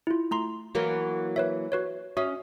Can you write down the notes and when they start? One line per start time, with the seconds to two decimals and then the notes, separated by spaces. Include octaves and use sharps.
0.07 E4 F4
0.31 A3 A#5 C6
0.75 E3 F#3 A#3
1.36 B4 C#5 E5
1.72 F#4 B4 C#5
2.17 C#4 F#4 E5 D#6